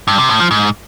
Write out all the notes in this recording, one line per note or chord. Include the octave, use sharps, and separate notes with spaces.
G2
C3
A2
F3
G#2